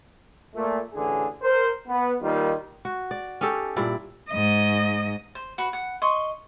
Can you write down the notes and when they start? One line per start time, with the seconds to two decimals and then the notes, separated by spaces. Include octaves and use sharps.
0.55 A#2 A3
0.93 A1 D3 G#4
1.42 A#4 C5
1.87 B3
2.21 D#3 G3 A#3 D#4 F4
2.85 F#4
3.11 D5
3.41 C#4 D#4 G4 A4
3.76 G2 A#2 E4 D5
4.30 G#2 D#5
5.35 C5
5.58 F#4 B4
5.73 F#5
6.02 D#5 C6 C#6